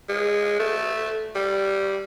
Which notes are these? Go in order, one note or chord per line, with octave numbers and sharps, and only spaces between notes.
G#3
A3
G3